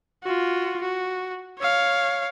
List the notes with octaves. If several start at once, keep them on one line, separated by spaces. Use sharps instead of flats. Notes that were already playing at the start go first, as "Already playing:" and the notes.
F4 F#4
F#4
C#5 F5